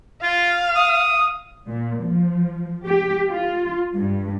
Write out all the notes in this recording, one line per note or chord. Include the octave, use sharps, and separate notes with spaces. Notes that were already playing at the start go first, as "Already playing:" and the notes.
F4 F5
D#6
A#2
F3
G4
F4
G2